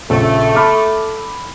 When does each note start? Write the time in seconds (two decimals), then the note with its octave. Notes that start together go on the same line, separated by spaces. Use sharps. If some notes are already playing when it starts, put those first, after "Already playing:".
0.10 A#1 C#3 A3 A#3 A4
0.55 B5 D6 F6